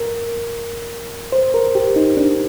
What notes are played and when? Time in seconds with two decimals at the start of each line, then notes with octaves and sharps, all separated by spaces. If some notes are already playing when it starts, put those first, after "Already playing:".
Already playing: A#4
1.32 C5
1.54 A#4
1.75 G4
1.96 D#4
2.17 D4